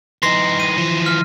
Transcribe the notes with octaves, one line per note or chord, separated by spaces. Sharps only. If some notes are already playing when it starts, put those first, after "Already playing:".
E3 D#4 C6 A#6 C7
D#7
E3 F3
F6